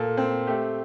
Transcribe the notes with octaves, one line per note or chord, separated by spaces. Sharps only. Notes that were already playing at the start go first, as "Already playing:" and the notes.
Already playing: A#2 A4
C4
A3 G4